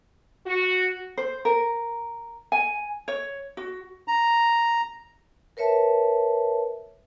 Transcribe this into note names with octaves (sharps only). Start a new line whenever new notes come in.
F#4
C5
A#4
G#5
C#5
F#4
A#5
A#4 B4 C#5 E5 A5